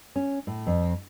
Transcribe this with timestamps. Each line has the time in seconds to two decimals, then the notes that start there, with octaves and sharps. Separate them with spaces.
0.16 C#4
0.47 A2
0.67 F2